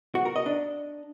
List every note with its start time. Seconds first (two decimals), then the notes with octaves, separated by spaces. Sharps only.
0.15 F#4
0.25 A#4
0.36 D#5
0.46 D4